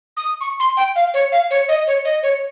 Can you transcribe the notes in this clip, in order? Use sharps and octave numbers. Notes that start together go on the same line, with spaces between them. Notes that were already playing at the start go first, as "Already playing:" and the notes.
D#6
C#6
C6
G5
F5
C#5
F5
C#5
D#5
C#5
D#5
C#5